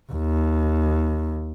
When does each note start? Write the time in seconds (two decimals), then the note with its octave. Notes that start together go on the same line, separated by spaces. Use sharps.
0.12 D#2